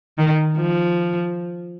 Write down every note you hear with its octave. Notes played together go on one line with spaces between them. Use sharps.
D#3
F3